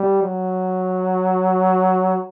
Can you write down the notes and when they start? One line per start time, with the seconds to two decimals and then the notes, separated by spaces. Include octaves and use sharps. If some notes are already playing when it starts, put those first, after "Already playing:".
Already playing: G3
0.23 F#3